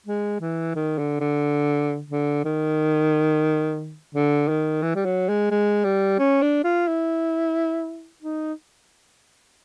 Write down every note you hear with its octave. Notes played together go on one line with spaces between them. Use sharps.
G#3
E3
D#3
D3
D3
D3
D#3
D3
D#3
E3
G3
F#3
G#3
G#3
G3
C#4
D4
F4
E4
D#4